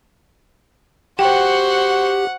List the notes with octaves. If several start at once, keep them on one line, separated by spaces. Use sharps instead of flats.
F#4 G4 C5 F#5 G5